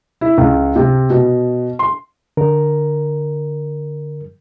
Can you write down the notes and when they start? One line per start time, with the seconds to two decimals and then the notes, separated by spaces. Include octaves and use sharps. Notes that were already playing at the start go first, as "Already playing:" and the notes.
0.21 E4
0.38 C#2
0.76 C3
1.10 B2
1.79 C6
2.37 D3 A#4